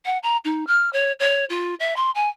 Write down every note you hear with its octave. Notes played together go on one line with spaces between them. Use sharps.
F#5
A#5
D#4
F6
C#5
C#5
F4
E5
C6
G#5